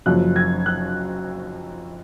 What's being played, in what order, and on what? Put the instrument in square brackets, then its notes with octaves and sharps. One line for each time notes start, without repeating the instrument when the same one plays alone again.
[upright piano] F#1 F#2 F3 F#6
G#6
F#6